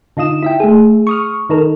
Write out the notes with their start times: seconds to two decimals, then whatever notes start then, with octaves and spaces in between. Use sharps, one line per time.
0.17 D3 D#4 F4 D#6 E7
0.43 E4 E5 G5
0.60 A3 G#4
1.07 C#6 D#6 F6
1.50 D#3 D#4 A4 A#4